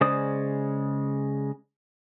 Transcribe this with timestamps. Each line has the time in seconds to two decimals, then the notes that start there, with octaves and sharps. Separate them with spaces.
0.01 C#3 G#3 C5 D5 D#6